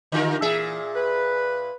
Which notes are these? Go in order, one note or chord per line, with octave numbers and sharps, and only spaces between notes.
D3 F4 G4 A#4
A#2 E3 G#4 E5
B4